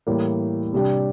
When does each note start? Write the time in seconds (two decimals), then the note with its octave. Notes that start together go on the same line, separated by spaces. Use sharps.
0.07 A2 E3 G3 A#3
0.73 C3 G3 D4 G4